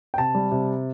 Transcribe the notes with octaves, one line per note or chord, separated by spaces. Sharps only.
G5
C3 A5
G3
C3